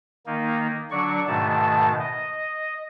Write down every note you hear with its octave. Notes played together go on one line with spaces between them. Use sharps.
D#3 A#3 D#4
D3 F#3 D4 D5 C#6
G#2 B2 D#3 A3 A5
D#5